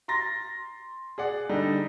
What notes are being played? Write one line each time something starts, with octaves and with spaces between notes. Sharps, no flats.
A#5 C6 A6 A#6
G#4 D5 F#5
D3 G3 D#4